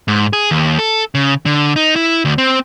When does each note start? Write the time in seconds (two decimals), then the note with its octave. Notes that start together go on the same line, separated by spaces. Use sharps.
0.08 G#2
0.33 G#4
0.51 D#2
0.79 A4
1.15 C#3
1.46 D3
1.76 D#4
1.96 E4
2.25 D2
2.38 C4